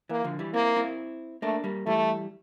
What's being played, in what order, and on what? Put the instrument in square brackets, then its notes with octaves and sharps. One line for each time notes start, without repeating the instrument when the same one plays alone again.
[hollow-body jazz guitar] E3 [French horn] A#3
[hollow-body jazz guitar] D3 F3
E3 G3
[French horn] A#3 [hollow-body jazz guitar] C4 E4
[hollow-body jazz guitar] C4 E4
[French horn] A3 [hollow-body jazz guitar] A#3 D4
[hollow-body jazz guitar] G3 A#3
[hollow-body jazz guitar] E3 G3 [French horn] A3